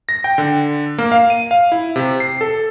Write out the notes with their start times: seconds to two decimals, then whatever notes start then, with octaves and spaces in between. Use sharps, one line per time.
0.09 A#6
0.24 G5
0.38 D3
0.98 A#3
1.12 F5
1.30 D#7
1.51 F5
1.72 E4
1.96 C3
2.20 C7
2.41 A4